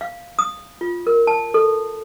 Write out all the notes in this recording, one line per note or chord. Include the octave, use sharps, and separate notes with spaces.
F5
D#6
F4
A#4
A5
A4